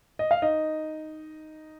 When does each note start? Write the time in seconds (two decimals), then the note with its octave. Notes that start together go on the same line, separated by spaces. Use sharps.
0.19 D#5
0.31 F5
0.42 D#4 D#5